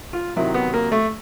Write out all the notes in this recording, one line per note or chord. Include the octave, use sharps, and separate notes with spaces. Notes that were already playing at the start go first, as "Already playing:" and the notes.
F4
C3 D#3 F#3 E4
B3
A#3
A3